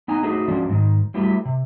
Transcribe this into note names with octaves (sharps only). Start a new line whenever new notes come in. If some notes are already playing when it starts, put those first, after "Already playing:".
B3 D#4 G#5 A#5
A3 D#4 F#4 G#4 B4
F3 G#3 C#4 D4 F#4
G#2 D#3
F#3 G3 A3 E4 G4 B4
C3